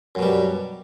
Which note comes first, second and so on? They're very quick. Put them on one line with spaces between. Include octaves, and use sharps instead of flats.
F#2 B2 G3